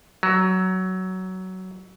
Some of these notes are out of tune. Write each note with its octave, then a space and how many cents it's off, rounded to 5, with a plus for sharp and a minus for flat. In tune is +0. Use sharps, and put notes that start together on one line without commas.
F#3 +15